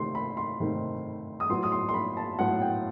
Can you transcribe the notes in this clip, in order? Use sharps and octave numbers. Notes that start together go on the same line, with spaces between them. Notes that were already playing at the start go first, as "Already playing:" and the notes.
Already playing: C3 D#3 A3 C6
B5
C6
C3 D#3 A3
D#6
A2 F#3 B3 C6
D#6
C6
C6
B5
A5
A2 F#3 B3 F#5
G5